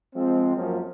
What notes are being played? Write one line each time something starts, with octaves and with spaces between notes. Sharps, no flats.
F3 G#3 C4
F#2 F3 F#3 A#3 C#4